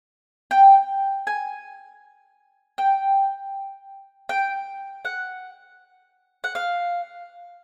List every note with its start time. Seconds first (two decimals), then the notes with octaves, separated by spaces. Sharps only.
0.51 G5
1.27 G#5
2.78 G5
4.29 G5
5.05 F#5
6.44 F#5
6.55 F5